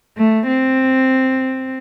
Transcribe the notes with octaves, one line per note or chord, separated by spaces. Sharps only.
A3
C4